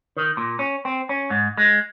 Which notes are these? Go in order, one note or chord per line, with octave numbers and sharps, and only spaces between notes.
D#3
A#2
C#4
C4
C#4
G#2
G#3